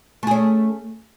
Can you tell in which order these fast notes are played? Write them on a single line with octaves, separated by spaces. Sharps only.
A3 G#4 C#4